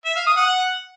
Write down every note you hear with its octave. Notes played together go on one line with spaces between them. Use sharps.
E5
F5
D#6
F#5